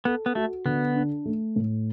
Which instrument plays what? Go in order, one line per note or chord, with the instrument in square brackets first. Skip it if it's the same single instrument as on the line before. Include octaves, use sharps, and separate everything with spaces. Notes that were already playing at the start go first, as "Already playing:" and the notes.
[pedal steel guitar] B3 [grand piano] A4
[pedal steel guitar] B3
[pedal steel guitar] A3 [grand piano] F#4
[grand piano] D3 [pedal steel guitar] B3
[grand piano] D4
A3
A2